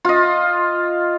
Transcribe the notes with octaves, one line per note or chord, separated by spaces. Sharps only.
F4 D#5